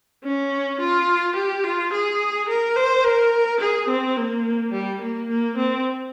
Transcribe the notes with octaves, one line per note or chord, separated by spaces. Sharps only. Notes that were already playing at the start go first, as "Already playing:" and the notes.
C#4
F4
G4
F4
G#4
A#4
C5
A#4
G#4
C4
A#3
G3
A#3
A#3
C4